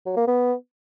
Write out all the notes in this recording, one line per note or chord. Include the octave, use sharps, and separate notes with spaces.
F#3
A#3
B3